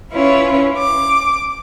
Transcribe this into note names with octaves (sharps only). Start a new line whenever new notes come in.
C#4 E4 F4 B4 C#5
D6